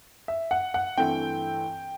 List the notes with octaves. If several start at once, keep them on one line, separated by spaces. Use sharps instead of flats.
E5
F#5
F#5
G2 E3 A3 C4 G5